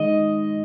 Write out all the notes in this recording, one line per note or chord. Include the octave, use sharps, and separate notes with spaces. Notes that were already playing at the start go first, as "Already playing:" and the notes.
Already playing: D#3 G#3 D#4 D#5